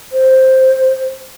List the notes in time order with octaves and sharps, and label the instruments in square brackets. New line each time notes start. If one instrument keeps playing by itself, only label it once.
[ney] C5